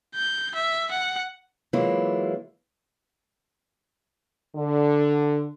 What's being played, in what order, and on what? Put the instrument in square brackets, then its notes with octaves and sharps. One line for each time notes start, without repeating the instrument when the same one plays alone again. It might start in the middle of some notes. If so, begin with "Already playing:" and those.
[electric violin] G6
E5
F#5
[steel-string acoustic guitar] E3 F#3 G#3 A#3 E4 F4
[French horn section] D3